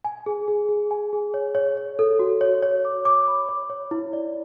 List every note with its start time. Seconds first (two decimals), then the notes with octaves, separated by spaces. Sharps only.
0.05 G#5
0.26 G#4
0.48 G#4
0.69 G#4
0.91 G#5
1.13 G#4
1.34 C#5
1.55 C#5
1.77 C#5
1.99 A4
2.19 F#4
2.41 C#5
2.63 C#5
2.85 D6
3.05 D6
3.28 B5
3.49 C#5
3.70 C#5
3.91 E4
4.13 D5